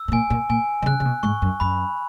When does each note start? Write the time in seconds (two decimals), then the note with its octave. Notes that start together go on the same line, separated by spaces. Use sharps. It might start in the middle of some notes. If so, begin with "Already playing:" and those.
Already playing: E6
0.08 G#2
0.12 A#2 G#5
0.30 A#2
0.49 A#2 G#5
0.82 D#3
0.86 C#3 F#6
1.00 C#3
1.05 B2
1.23 G#2 C#6
1.42 F#2
1.60 F#2 B5